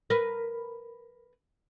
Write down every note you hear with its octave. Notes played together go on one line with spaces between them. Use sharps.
A#4 B4